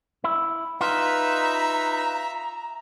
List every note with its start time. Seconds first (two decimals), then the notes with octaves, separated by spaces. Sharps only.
0.24 E4
0.81 D#4 F4 B4 E5 A#5